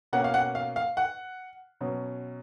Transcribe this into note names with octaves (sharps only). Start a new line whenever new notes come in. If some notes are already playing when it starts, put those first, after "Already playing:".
B2 A#3 C#4 F#5
F5
F#5
F5
F5
F#5
B2 F#3 C#4